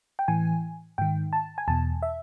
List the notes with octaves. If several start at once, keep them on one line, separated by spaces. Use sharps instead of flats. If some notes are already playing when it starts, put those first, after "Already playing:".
G5
A2 E3 G#5
G#2 D#3 G5
A5
G#5
E2 B2 A5
E5